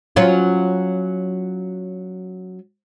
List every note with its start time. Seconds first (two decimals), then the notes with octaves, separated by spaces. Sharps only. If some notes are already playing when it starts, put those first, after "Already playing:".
0.16 F#3 C#4 F4